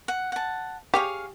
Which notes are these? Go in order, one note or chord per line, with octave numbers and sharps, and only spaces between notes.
F#5
F#5 A5
G4 G#4 C#5 F5